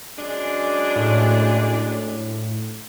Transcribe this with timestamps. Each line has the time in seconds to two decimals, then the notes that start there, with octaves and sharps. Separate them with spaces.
0.18 F#2 G#3 D4
0.96 A2